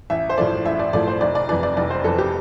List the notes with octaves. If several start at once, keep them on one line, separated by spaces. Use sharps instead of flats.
A1 E5
C5
A2 F3 A3 D5
A1 E5
D5
A2 F3 A3 D5
C5
F1 D5
D5
F2 E3 D5
D5
F1 D5
C5
F2 E3 A4
G4